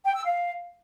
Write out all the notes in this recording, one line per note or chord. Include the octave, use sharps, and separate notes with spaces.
G5
E6
F5